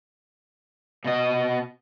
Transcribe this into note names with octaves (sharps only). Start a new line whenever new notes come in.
B2 D#5